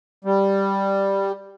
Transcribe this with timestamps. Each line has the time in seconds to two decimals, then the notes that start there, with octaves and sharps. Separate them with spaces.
0.25 G3